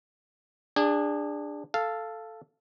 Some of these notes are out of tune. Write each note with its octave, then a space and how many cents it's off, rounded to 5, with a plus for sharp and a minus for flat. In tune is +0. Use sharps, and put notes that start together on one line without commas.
D4 +5 G#4 -25
A4 +0 F5 -10